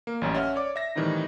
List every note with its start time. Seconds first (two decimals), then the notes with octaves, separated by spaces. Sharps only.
0.07 A#3
0.21 A1 F#2 G3
0.34 C#4 E5 F#5 F6
0.56 C#5 D5 D6
0.76 E5 A#6
0.96 A2 D#3 E3 G3 C4 D#4